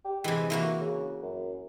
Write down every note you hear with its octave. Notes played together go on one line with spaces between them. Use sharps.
G4
C3 E3 G#3
E3 A#3 E4 F#4
C#3
F#2